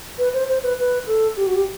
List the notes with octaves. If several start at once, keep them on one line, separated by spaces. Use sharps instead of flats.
B4
C5
C5
B4
B4
A4
G4
F#4
G4